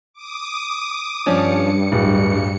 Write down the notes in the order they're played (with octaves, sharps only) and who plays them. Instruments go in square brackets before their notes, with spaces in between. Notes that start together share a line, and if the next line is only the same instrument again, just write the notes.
[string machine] D6 D#6
[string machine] G2 C#7 [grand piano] F3 C#4 D4
[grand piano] D1